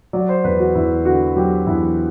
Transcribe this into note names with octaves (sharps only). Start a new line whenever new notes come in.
F#3 D5
C5
E2 B4
F#4
E2 E4
D3 F#4
F#3 G4
E2 E4